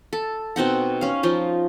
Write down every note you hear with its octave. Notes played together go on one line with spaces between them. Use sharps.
A4
B2 C4 D#4 F#5
C#4 F5
F3 D#4 F4